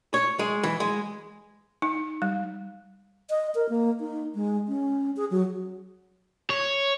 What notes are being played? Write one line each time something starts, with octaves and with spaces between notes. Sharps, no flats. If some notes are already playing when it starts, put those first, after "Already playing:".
C#5
G#3
E3
G#3
D#4
G3
D#5
A#4
A#3
D#4
G#3
C#4
G#4
F#3
C#5